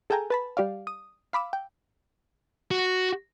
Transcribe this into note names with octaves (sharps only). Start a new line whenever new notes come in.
G#4 A4 F5 G5 G#5 A#5
B4 A5 B5
G3 G4 D5 F5
D#6
F5 B5 D6 E6
G5
F#4